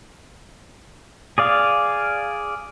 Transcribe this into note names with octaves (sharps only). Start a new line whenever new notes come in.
G#4 D5 F5